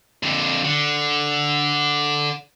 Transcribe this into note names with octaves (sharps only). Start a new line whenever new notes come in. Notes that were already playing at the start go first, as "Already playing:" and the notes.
F2 D3
D3